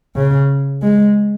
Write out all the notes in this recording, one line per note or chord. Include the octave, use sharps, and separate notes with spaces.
C#3
G#3